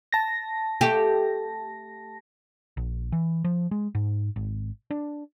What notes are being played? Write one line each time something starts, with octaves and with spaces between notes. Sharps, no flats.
A5 A#6
A3 G4
A#1
E3
F3
G#3
G#2
G#1
D4